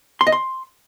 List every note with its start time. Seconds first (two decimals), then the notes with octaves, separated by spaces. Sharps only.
0.21 C6
0.27 D#5
0.32 C6